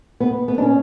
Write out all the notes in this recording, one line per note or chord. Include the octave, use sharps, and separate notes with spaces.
B3
B3
D4
C#4